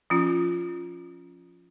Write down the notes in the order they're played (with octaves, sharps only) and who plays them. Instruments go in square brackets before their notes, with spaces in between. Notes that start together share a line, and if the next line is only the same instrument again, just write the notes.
[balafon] F3 C#4 F4